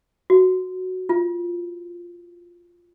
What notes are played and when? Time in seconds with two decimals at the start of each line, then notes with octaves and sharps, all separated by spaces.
0.30 F#4
1.09 F4